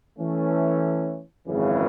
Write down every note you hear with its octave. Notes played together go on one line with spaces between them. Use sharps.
E3 A3 C#4
G#1 F#2 C#3 E3